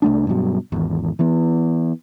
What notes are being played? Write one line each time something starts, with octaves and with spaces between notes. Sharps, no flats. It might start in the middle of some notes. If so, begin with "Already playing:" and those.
C2 A3 D4
G2 B2 F3 F#3
G#1 E2
E3 B3